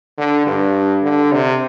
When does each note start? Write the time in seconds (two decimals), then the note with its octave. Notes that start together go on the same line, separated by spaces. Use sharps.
0.17 D3
0.47 G2
1.03 D3
1.32 C3